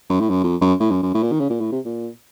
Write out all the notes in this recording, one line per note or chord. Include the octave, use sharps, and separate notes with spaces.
F#2
A2
F#2
F2
F#2
A2
F#2
F#2
A2
A#2
D#3
C#3
A#2
A2
C3
A#2